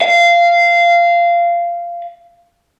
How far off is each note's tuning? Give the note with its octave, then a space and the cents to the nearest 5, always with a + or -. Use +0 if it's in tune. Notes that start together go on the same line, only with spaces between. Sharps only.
F5 -15